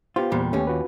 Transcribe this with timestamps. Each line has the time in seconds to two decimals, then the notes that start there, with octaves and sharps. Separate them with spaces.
0.16 B3 F4 G4 C5
0.31 E2 A#2 G3
0.53 D#2 A3 B3 C#4 G4
0.67 F4 F#4 B4